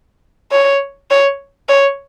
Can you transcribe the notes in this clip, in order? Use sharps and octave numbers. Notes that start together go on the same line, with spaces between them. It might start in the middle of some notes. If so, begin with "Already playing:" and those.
C#5
C#5
C#5